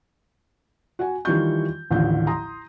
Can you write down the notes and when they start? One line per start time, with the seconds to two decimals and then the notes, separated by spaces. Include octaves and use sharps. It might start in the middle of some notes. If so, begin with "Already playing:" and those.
0.99 F#4 F#5 G#5
1.25 D#3 E3 G3 F4 C#6 G6
1.91 A1 D#2 D3 F3 G6
2.27 A#5 C6 D#6